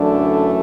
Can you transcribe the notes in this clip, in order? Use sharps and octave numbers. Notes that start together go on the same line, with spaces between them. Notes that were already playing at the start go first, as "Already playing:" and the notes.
Already playing: F#2 D3 E3 A3 D4